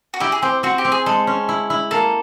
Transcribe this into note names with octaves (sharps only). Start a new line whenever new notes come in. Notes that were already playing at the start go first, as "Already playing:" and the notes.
F#4
E4 G4
G#4
C4 G4
C4 F#4
G4
C4
G#4
G#3 A4
C#4
E4
E4
A#3 A4